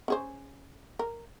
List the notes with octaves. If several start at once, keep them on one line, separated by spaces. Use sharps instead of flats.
C#4 G#4 C5
A#4